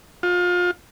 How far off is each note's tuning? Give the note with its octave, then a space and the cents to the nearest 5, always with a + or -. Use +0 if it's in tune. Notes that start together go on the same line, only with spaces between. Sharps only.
F4 +30